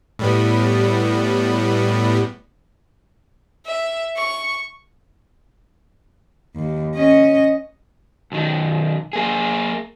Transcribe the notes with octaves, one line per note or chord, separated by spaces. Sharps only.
A2 G3 B3
E5
C#6
D#2
C#4 D#5
B1 D#3
A#3 G#4